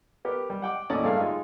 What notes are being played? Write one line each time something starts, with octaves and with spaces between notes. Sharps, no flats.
B3 G4 A#4
G3
F#5 G5 D6
D#2 A2 F#3 C#4 D5 D#5
G2 C#3 A3 A#3 C#4 F5
G#3 D#4 F4